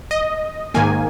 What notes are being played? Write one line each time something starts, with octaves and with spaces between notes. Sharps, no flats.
D#5
G#2 D#3 A#3 G#5